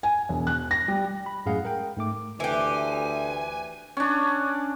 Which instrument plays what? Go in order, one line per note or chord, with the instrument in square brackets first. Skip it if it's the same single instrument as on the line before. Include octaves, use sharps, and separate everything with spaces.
[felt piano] G#5
E1
F#6
A#6
G3
[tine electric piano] B5
F#2 A2 G#3 G#4 F5 F#5
A#4 G5
G#2 A3 D6
[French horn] D2 [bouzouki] E3 G4 [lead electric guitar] G#5
[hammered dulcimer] C#4 D4